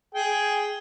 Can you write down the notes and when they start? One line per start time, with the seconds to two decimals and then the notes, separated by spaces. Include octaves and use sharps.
0.15 G#4 G5